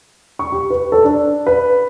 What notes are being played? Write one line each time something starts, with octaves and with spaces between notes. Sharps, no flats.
C#6
G4
B4
A4
D4
B4